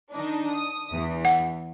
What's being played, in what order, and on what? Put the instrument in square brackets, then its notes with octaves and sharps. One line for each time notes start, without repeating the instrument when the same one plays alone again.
[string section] D#3 D4 D#4
D#6
E2 E3
[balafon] F#5